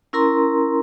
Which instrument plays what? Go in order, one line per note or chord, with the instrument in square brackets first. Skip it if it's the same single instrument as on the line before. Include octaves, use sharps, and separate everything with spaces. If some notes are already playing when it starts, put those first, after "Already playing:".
[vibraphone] C#4 E4 A#4 A#5 C6